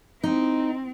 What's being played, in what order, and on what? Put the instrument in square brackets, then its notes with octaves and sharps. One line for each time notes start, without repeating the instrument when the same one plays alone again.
[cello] C4 [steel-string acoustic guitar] D#4